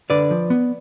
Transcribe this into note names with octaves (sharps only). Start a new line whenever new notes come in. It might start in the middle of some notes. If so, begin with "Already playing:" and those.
D3 B4 D5
F3
B3